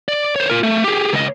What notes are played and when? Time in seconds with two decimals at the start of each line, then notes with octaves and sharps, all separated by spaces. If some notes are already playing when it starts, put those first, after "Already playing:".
0.08 D5
0.36 C5 C#5
0.50 F4 A#4
0.63 A3
0.84 G4 G#4
1.12 C#2 D#5